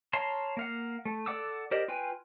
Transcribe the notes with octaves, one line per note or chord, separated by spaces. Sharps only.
C#5 F5 A5 A#5 C6
A#3 F5 F#5
A3
A4 D5 F#5 D6 E6
G4 A#4 C5 D5 D#5
F4 B4 G5 G#5